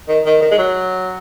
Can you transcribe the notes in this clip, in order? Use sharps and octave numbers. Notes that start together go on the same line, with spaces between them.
D#3
D#3
D#3
G#3
F#3